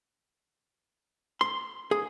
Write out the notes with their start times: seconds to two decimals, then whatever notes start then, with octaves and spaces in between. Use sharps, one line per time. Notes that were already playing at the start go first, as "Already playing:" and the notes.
1.41 C6
1.91 G#4